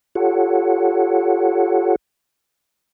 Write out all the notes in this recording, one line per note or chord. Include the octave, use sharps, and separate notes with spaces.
F4 G4 A4 C#5 F#5